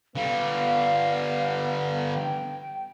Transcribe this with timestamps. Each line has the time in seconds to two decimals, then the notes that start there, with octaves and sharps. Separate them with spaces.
0.15 D3 G3 B3 F5
2.15 G5